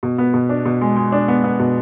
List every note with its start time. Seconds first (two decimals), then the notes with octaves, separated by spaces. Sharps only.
0.03 B2
0.18 B3
0.34 B2
0.49 D4
0.65 B2
0.81 G#3
0.96 G#3
1.12 D4
1.28 B3
1.44 B3
1.60 B2